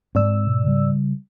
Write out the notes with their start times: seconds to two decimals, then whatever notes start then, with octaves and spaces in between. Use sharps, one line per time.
0.15 G#2 G#3 A#3 C4 D5 E6
0.47 B2
0.64 C#3 G3